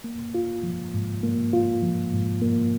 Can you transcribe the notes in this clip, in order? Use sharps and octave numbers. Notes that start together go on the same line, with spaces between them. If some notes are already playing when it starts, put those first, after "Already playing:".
A#3
F4
F3
G#2
A#3
F4
F3
G#2
A#3